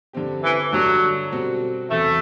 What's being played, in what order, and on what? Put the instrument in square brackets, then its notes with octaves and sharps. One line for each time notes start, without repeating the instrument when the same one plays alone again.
[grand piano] G2 D3 G3 C4 G4
[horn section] E3
[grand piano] G2 D3 G3 D4 F#4 [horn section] F#3
[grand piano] B2 G3 C4 F#4 A4
[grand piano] E2 C3 F#3 [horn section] A3